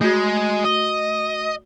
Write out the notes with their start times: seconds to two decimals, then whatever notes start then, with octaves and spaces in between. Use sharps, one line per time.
0.01 G#3 A3 F#4
0.65 D#5